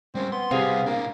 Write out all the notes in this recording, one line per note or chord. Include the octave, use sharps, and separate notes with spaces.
G3 C4 C#4
B3 C6
C3 G3 C4 G4 G#4 F5
A2 A#3 D4